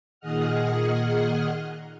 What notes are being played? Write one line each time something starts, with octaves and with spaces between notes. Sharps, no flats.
A#2 D#3 G#4 D#5 F#5 F6